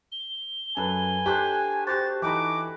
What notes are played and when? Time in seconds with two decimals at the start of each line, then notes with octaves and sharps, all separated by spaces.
0.12 G7
0.77 F#2 A4 B4 G#5
1.26 A3 D4 G4 C5
1.87 F#4 G4 C5 A6
2.22 E3 A3 D#4 F#4 B5 D6